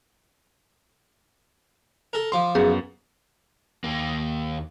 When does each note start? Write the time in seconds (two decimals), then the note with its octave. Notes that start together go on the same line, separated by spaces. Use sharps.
2.13 A4 A#4
2.32 F3 C6 D6
2.55 F#2 B3 G#4
3.84 D#2 A#3